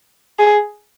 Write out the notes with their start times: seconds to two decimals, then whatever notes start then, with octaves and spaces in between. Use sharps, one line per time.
0.39 G#4